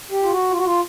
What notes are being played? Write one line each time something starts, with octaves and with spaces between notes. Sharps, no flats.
G4
F4
F#4
F4
F#4
F4